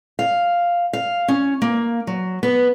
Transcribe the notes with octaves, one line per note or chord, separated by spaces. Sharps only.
F5
F5
C#4
A#3
F#3
B3